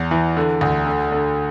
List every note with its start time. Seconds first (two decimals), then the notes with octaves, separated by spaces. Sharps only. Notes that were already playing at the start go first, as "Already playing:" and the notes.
Already playing: E2
0.11 E3
0.37 D3
0.61 D2
0.86 D3
1.12 D3